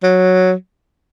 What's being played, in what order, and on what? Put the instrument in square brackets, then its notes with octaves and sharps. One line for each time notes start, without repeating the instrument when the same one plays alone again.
[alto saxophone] F#3